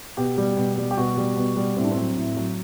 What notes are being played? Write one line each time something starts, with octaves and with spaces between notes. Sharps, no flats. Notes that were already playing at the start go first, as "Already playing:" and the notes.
B2 G4
G3
B2
G3
G4
B2 F#4
G3
B2
G3
A2 C4
D4
C4
F#3
A2
F#3